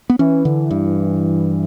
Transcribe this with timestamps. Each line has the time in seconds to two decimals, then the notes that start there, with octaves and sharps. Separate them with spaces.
0.10 B3
0.19 E3 C#4
0.45 D3
0.71 G2